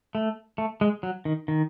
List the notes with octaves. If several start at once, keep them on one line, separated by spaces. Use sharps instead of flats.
A3
A3
G#3
F#3
D#3
D#3